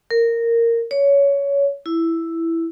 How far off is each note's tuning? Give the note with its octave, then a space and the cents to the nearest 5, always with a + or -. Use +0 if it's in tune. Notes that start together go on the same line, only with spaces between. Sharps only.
A#4 -10
C#5 +20
E4 +5